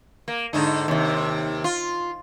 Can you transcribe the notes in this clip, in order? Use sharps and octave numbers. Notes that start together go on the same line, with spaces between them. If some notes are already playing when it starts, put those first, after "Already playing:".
A#3
G#2 D3 D#4
D#2 C3
F4